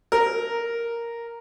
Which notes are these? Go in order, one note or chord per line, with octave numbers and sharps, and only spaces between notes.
A#4